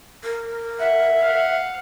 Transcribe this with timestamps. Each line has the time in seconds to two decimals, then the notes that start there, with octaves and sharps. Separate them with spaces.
0.24 A#4
0.79 E5 F#5
1.22 F5 F#5